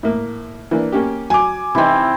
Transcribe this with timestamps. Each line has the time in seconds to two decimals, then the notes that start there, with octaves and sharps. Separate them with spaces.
0.03 A2 A#3
0.71 E3 A#3 D4
0.92 A#3 C#4 G4
1.30 F#3 G#5 D6
1.75 C3 E3 C4 D#4 E4